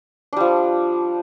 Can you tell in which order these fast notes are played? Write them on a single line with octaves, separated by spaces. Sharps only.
D4 G3 F3